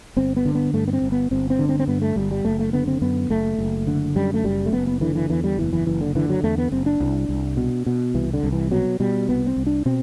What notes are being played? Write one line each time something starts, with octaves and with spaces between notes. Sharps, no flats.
G1 C4
B3
D3
B3
G2 A3
B3
C4
G1
B3
G1 C4
C4
D3
C4
C4
G2 B3
A3
G1 G3
G3
F#1 A3
A3
D3 B3
C4
F#2 B3
F#1 A3
F#1
D3
F#2 G3
A3
F#1 G3
A3
F#1 B3
B3
D3 E3
E3
E2 E3
G3
F#1 E3
E3
F#1 E3
D3
D3 E3
F#3
E2 A3
B3
F#1 C4
D4
C2
C2
B2
B2
C2 E3
D3
C2
E3
B2 F#3
B2 G3
C2 B3
C4
C2
D4
B2 C4